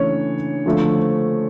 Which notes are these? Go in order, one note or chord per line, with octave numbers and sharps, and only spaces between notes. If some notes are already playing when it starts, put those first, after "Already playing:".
Already playing: C#3 E3 A3 D4 C#5
D3 F3 A3 C4